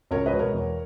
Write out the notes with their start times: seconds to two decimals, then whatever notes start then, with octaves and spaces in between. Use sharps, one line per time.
0.11 C#2 A#4 C#5
0.26 B4 D#5
0.33 B2 G#3 B3
0.39 A#4 C#5
0.53 E2